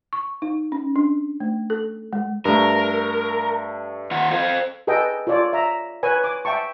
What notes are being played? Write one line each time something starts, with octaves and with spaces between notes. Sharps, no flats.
C#6
D#4
C#4
D4
A3
A4
G#3
G2 A3 A#4
D#3 F4 F#5
A4 C5 F5
G#4 A4 B4 D#5 G5
F4 A4 C#5 D5
E5 A#5
B4 C#5 G#5
D6
E5 G5 A5 C#6